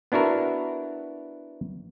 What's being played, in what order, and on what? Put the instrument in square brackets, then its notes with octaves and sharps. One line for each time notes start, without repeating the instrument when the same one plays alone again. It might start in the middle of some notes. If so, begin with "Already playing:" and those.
[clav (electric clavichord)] B3 D4 E4 F#4 A#4